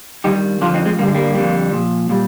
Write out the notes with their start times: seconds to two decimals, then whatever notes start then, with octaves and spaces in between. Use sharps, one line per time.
0.24 G2 D#3 G3 D#4 G4
0.61 F2 D3 F3 D4 F4
0.74 C4 D#4
0.85 G#3 C4
0.99 G2 D3 G3 A#3
1.07 G#3
1.15 G3 A#3
1.35 F2 D3 G3
1.72 A#2 F3
2.09 A#2 G3